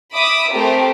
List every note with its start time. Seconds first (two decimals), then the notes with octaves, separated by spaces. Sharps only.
0.14 E5 B5 D6 D#6
0.52 A3 C4 G4 A#4